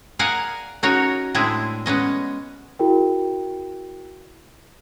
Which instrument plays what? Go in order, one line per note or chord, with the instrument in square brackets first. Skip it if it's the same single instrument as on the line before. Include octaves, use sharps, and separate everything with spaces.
[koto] G#4 A#4 D5 F5 F#5 G#5
C#4 D#4 F#4 A#4 C#5
A2 G#3 C4 D4 E4 G#4
G#3 B3 C#4 D#5
[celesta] E4 F#4 G#4 A#4 G5